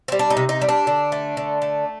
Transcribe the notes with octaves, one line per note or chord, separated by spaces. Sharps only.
G3 C4
D4
D#4
C3
D#4
G3
D4
D3
A3
D3
A3